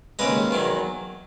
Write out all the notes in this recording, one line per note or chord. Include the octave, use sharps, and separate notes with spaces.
D#2 C#3 G#3 B4 D#5
E2 D#3 F#3